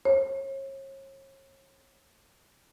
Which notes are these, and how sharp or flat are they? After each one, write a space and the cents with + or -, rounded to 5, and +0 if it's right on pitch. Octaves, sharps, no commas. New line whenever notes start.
C#5 -40